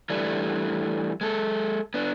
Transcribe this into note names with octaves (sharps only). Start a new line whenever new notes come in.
E3 G3 A3 D4
G#3 A4
B3 D4